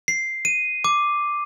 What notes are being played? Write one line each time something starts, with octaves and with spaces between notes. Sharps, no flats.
C7
D#7
D6